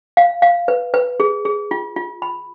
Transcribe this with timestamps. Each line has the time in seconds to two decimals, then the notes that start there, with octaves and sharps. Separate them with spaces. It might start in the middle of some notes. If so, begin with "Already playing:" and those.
0.17 F5
0.42 F5
0.68 B4
0.94 B4
1.20 G#4
1.45 G#4
1.71 F4
1.96 F4
2.22 B5